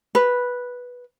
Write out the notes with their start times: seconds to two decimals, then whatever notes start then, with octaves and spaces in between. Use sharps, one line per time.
0.15 B4